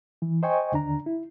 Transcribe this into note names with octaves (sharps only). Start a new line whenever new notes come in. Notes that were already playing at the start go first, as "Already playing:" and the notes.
E3
C5 D#5 G5 G#5 C#6
D#2 D3 D4 A#5
E4